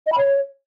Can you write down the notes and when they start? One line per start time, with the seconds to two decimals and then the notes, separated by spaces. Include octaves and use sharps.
0.07 D#5
0.12 B5
0.18 C#5